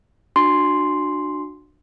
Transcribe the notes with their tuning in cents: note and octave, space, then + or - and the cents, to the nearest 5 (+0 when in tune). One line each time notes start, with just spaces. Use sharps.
D4 +25 F#4 -15 C6 +0